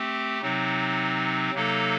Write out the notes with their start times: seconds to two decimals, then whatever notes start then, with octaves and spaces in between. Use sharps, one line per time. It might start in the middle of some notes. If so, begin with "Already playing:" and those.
Already playing: A3 C4 G4
0.41 C3 F#3 C4 D#4
1.54 C3 F#3 A#3 D#4 A4